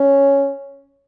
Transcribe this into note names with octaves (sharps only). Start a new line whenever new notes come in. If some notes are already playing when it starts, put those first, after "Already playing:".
Already playing: C#4